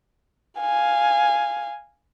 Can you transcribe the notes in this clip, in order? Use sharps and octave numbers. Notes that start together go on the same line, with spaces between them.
F5 G#5